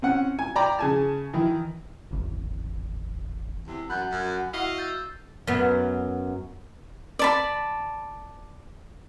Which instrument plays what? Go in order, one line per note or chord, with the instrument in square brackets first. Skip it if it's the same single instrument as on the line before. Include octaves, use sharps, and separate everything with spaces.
[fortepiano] C4 C#4 F#5
G#5
D5 G5 A#5 B5 D6
C#3 G#5 A5
D#3 E3 E4
[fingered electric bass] D1 G#1 E2
[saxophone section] E2 C3
[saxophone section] F#2 [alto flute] F#5 [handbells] B5 F#6 G6
[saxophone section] F#2
[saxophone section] E4 D#5 F5 [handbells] F#4
[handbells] E6 G6 A6
[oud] F#2 B3
[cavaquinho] D5 A5 B5